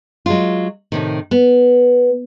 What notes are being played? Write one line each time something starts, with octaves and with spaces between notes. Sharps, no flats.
F#3 G#3 F4
A2 C3 D#3
B3